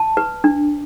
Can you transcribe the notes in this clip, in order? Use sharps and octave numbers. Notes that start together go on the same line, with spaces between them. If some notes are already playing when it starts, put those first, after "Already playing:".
Already playing: A5
B4
D4